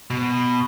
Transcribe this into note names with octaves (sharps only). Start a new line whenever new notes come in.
B2